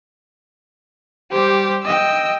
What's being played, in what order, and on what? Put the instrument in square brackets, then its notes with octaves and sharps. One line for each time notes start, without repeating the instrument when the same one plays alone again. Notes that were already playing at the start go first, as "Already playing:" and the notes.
[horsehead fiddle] G3 C5 [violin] G4
[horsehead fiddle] D#5 G5 [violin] E6